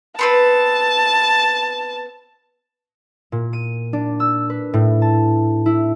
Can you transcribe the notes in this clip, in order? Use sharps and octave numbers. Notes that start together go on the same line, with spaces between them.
B3 C4 B4 A5
A#2
D#7
D4
E6
B4
A2
A5
E4